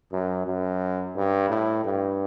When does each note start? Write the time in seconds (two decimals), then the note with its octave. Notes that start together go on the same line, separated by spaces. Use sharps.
0.12 F#2
0.47 F#2
1.16 G2
1.50 A2
1.85 G2